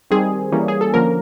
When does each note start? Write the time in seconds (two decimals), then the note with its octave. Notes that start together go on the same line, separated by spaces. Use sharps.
0.11 D#3 G3 C4 G#4
0.52 E3 G3 A#3 C#4
0.68 G#4
0.81 A4
0.94 D3 F3 A#3 C#4 A#4